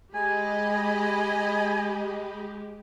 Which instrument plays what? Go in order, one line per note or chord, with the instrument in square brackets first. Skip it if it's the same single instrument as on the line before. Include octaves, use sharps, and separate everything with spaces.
[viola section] G#3 G4 [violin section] D#5 B5 [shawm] G#5